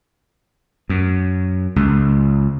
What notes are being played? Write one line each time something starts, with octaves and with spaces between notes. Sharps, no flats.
F#2
C#2